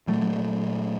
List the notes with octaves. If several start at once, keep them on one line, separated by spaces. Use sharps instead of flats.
A#2 F#3 A3